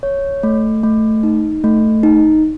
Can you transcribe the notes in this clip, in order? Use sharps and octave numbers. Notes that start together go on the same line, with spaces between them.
C#5
A3
A3
D#4
A3
D#4